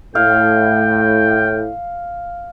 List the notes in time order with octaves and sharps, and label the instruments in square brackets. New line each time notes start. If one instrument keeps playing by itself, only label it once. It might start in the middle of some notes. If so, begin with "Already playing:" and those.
[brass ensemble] A2 [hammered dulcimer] F5 [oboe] G5